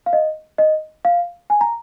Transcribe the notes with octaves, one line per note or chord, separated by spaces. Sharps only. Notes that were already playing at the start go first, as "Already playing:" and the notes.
F5
D#5
D#5
F5
G#5
A#5